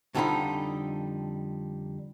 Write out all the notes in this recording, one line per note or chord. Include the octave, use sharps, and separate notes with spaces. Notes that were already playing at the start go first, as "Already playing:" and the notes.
F2 D3 G3 D#4 F4 B5